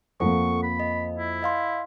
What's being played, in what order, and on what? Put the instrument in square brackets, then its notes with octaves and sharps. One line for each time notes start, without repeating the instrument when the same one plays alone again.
[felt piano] F2 A#3 [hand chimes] A4 F#5 [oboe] C#6
[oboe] B5
[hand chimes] D#5
[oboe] E4
[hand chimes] D#5 F5 C6